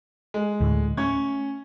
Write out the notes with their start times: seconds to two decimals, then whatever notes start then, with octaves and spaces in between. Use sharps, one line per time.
0.34 G#3
0.60 D2 A2 D3
0.97 A3 C#4 C#6 G#6